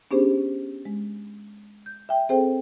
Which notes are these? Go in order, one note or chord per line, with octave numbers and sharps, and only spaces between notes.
B3 C#4 D4 G4 G#4 C5
G#3
G6
E5 G5
C4 G#4 A4 C5 G5